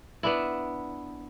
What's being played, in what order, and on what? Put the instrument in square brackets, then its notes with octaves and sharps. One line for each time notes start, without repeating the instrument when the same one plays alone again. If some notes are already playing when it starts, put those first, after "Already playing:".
[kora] B3 D4 E4